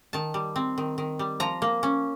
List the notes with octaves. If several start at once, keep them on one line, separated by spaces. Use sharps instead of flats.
D#3 A5
G3
C4
D#3
D#3
G3
F3 A#5
A#3
C#4